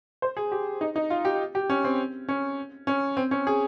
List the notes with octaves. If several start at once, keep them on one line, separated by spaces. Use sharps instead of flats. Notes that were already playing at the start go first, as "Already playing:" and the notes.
C5
G#4
G4
D#4
D#4
F4
G4
G4
C#4
C4
C#4
C#4
C4
C#4
G#4